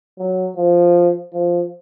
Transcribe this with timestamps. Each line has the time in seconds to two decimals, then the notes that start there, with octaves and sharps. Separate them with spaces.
0.19 F#3
0.57 F3
1.33 F3